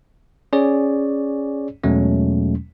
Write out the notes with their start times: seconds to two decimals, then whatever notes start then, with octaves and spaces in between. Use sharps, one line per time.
0.53 C#4 G#4 C#5 D5
1.84 E2 B2 F#3 G#3 A3 C#4